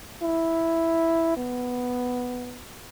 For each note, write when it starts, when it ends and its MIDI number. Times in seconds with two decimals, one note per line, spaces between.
0.22 1.32 64
1.37 2.62 59